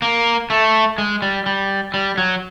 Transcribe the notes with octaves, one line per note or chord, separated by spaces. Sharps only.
A#3
A3
G#3
G3
G3
G3
F#3